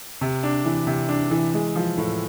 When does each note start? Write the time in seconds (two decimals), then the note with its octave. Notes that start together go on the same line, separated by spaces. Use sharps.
0.21 C3
0.43 D4
0.65 E3
0.87 C3
1.09 D4
1.31 E3
1.54 G#3
1.76 F3
1.97 A2